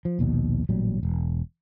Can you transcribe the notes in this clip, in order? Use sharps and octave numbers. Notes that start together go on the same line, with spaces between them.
F3
A#1 D#2 B2
A1 A#2 F#3 G3
E1